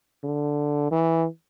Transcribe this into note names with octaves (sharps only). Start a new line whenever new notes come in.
D3
E3